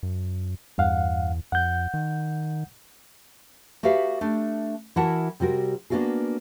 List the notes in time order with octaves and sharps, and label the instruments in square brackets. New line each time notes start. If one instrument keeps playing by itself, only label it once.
[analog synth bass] F#2
[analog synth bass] E2 [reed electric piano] G2 F5 F#5
[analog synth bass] F2 [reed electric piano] F#5 G6
[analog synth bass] D#3
[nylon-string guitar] F#4 G4 A4 B4 E5 F5
A3 D4
E3 E4 F#4 A#4 F#5 A5
C3 G3 F#4 A#4
A#3 B3 D4 F4 F#4 G#4